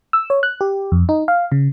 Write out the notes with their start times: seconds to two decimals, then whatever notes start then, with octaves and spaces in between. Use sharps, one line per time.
0.13 E6
0.30 C#5
0.43 F#6
0.61 G4
0.92 F2
1.09 D#4
1.28 F5
1.52 C#3